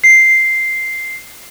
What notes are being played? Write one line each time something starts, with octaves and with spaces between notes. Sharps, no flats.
C7